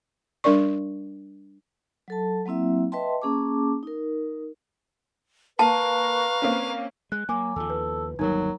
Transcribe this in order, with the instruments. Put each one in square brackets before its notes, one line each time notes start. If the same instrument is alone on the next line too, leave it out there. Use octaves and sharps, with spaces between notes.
[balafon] G3 D4 A#4 D5 C#6
[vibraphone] F#3 A4 A5
F#3 A#3 C4 E4 E5
B4 D#5 E5 G5 A5 C6
A#3 C#4 G#4 A5 D6
D#4 A#4
[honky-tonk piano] A#3 [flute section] B4 A#5 C#6 [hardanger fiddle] F5 [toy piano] A5
[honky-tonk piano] A#3 C4 C#4
[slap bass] G#3 [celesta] F#6
[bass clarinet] F#3 [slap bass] A#3 [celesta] G#5 D6
[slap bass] D#2 F3 [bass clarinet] A4
[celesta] B4
[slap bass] G1 D#2 G3 [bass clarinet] F#3 [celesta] D#4 A#4